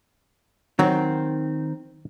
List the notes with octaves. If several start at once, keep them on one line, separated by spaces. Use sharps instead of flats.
D#3 F#3 C4